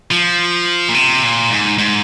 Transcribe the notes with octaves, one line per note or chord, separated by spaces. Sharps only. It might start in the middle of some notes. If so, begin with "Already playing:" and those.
F3
A#2
C3
A#2
G#2
G#2